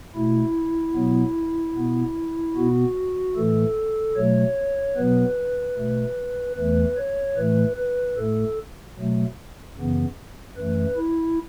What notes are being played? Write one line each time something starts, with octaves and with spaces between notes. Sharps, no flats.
B2 A3 E4
B2 F#3 B3
B2 B3
B2 B3 F#4
A2 E3 A3 A4
B2 F#3 A3 C#5
B2 F#3 B3 B4
B2 A3
E2 E3 A3 B4
C#5
A2 E3 A3 B4
B4
A2 A3 A4
B2 F#3 A3
F#2 C#3 E3 B3
F#2 E3 A3 B4
E4